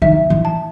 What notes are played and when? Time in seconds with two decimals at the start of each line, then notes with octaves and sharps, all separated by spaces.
0.02 D#3 E5
0.30 E3
0.45 A5